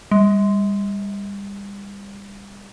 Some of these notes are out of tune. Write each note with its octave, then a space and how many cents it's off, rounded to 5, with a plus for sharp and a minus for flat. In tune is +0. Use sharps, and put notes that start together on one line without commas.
G3 +35